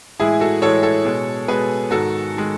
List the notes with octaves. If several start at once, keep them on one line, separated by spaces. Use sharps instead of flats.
A2 E3 G#3 E4 G#4
F#4 A4
A2 E3 G#3 A4 C#5
A4 C#5
B2 G#3
B2 G#3 G#4 B4
G#2 D#3 G#3 F#4 A4
D#3 G#3